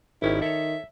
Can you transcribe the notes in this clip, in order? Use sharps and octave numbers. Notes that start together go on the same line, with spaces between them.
G#1 D#3 C#4 E4 G4
A4 C#5 E5